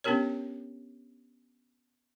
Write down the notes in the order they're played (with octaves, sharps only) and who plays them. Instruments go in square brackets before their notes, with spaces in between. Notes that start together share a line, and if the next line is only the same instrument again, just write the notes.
[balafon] B3 C#4 D4 G4 A#4 C#5